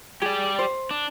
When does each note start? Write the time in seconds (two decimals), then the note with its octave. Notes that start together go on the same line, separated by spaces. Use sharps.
0.22 G4 G#4 D5
0.59 C5
0.91 D4